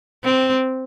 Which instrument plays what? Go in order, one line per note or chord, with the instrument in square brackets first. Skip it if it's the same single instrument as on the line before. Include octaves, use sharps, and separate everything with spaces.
[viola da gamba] C4